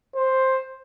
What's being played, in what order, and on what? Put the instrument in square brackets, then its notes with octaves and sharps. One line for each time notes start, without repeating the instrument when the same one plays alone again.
[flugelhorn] C5